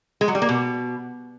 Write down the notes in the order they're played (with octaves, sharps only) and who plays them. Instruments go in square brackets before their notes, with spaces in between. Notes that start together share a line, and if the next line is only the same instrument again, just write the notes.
[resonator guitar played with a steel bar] G#3
F#3
G3
A#3
B2